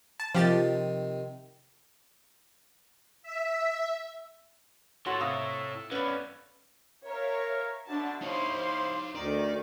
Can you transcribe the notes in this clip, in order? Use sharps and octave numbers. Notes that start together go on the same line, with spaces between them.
A5
C3 D#3 F3 G4 A6
E5
E4 F#4 A4 C#5 C6 A6
C3 F5 D#6 E6
B3 C#4 B4 D5
A#4 C#5 E5 F5
B2 D3 D4 E5 A5
D#4 E4 C5 C#5 F5 C6
D2 D#3 D5